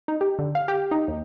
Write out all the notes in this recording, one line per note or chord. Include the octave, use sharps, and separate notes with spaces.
D#4
G4
D3
F5
G4
D#4
D#2